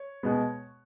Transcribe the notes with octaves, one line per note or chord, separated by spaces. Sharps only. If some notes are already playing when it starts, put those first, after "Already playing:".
Already playing: C#5
B2 G#3 B3